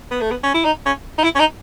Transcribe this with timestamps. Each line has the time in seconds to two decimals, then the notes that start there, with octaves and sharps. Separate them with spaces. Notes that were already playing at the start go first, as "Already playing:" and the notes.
0.11 B3
0.21 A3
0.31 B3
0.43 C#4
0.54 E4
0.65 D#4
0.86 C#4
1.18 D#4
1.24 E4
1.35 C#4
1.39 D#4